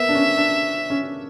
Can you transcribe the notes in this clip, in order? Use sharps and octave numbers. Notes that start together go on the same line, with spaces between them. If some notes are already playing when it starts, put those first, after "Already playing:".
Already playing: A#3 B3 E5
D4
C#4
D4
C#4